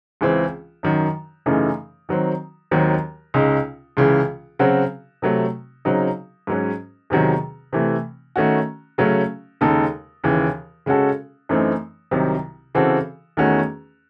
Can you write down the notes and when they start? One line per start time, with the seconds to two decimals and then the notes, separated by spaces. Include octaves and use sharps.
0.21 C#2 C#3 E3 C4
0.83 F#2 D#3 F#3
1.46 F#2 C#3 E3 A3 D#4
2.09 D#3 F#3 C4
2.71 D#2 D#3 F#3 C4
3.34 C#2 C#3 G#3 D#4
3.97 C#2 C#3 E3
4.59 C#3 F#3 C4 F#4
5.22 C3 F#3 A3
5.85 C#3 F#3 C4 D#4
6.47 G#2 F#3 C#4
7.10 E2 C3 D#3 F#3
7.73 C3 E3 A3
8.36 D#3 A3 C#4 F#4
8.98 C#3 F#3 A3 C#4
9.61 D#2 C#3 G#3 D#4 A4
10.24 D#2 C#3 E3
10.86 C#3 G#3 C#4 F#4 A4
11.49 F#2 E3 A3 C4 D#4
12.11 C2 C3 D#3 F#3
12.75 C#3 E3 C4 F#4 A4
13.37 E2 D#3 A3 C#4 F#4